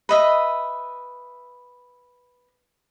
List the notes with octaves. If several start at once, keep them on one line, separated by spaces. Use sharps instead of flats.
B4 D#5 E5